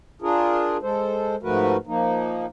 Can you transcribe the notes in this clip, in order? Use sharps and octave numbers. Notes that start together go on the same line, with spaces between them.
D4 F4 G#4 A#4
G#3 A4 C5
G#2 F3 A3 F#4 A#4 B4
F3 A#3 D#4